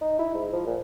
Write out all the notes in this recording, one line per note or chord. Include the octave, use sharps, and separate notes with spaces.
D#4
E4
G#2
F3
A#2